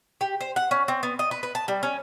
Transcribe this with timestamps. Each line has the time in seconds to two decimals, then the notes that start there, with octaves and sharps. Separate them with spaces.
0.21 G4
0.41 C5
0.56 F#5
0.71 C#4
0.88 C4
1.03 B3
1.19 D#5
1.31 B4
1.43 B4
1.55 A5
1.68 G3
1.83 C#4